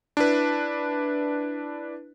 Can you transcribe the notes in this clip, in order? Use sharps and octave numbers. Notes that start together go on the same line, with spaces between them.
D4 E4 B4